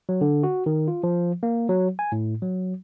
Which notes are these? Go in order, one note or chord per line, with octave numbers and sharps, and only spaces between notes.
F#3
D3
F#4
D#3
F4
F3
A#3
F#3
G#5
A2
F#3